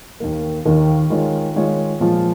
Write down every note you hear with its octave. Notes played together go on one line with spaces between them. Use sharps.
D#2 D#3 A#3
D#2 D#3 A#3
D#3 G#3 F4 C#5
D#3 G#3 F4 C#5
A#2 F3 G#3 F4